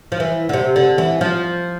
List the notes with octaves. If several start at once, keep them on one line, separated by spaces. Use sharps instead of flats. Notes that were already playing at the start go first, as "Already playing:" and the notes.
F3
E3
D3
C3
D3
E3
F3